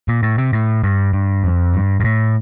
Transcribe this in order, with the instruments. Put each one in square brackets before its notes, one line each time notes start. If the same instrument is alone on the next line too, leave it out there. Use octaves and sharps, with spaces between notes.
[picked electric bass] A#2
A2
C3
A2
G2
G2
F2
G2
G2
A2